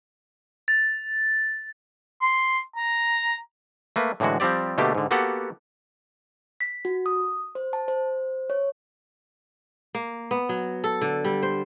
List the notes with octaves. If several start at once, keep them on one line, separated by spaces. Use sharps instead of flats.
A6
C6
A#5
A3 A#3 B4
A2 D3 E3 G#3 F#4
F3 G3 C4 G4 D5
B2 D3 A3 A#3 D4 G4
G#2 D3
A#3 B3 F#4 G4 A4 F#5
B6
F#4
D#6
C5
A5
C5
C#5
A#3
B3
F#3
A4
D3
G3
C5